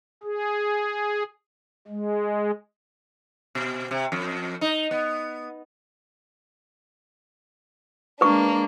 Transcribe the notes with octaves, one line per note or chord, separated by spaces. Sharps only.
G#4
G#3
B2
C3
F2
D#4
B3
G#3 A#3 D4 B4 C#6